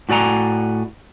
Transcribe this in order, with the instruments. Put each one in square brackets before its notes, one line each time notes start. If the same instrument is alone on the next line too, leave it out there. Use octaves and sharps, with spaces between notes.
[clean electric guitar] A2 F#4 D5 G#5 A#5